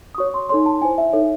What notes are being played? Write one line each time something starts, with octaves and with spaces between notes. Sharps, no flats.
D#6
F#4 C#5 C#6
C6
D#4 A4 C#5 C6
A5
E4 C5 G#5
E5
D#4 A4 C#5 E5